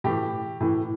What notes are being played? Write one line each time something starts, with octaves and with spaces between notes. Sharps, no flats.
A2 E3 G4
A2 E3